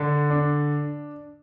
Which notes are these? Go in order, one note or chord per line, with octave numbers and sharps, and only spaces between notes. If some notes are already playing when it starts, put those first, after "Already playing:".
Already playing: D3 D4
D4